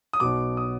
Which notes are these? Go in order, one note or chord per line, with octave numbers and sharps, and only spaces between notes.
D#6
B1 B2 D6
D#6